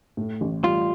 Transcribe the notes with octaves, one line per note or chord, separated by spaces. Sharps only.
A2
A1
G3 F4